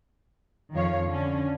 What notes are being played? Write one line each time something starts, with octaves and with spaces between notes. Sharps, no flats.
F2 D#3 F3 C#5 F5
D3 C#4